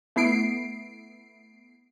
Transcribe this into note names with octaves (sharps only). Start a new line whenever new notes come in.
A3 B3 E4 C7 D7